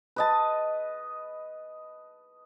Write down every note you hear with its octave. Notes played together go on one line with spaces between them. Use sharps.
B4 D#5 A5